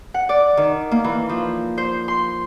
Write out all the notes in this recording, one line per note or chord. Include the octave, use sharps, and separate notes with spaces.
F#5
D5
D#3
A#3
E3
F3
C5
C6